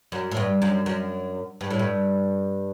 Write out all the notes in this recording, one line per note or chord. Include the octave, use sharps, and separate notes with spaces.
F#2
A2
G2
F#2
F#2
G2
A2
G2